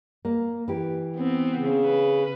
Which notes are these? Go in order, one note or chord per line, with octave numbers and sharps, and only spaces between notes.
A#3
E3 G4
B3 C4
C#3
B4